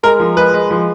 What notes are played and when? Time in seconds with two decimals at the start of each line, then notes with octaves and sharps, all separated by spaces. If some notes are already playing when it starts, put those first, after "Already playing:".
0.03 G#3 A#4
0.20 F3
0.37 G#3 B4
0.53 G#3
0.71 F3